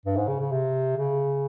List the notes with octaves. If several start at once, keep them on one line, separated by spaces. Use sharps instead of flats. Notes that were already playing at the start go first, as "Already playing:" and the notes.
G2
G#2
C#3
C#3
C3
C#3